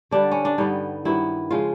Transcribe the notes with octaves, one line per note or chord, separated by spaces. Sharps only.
D3 G3 B3 D4
C#4
D4
G2 D3 G3 B3 D#4
G2 D#3 F#3 B3 E4
C#3 F3 G#3 F4